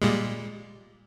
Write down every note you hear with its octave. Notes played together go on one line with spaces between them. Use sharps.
A#2 G3 G#3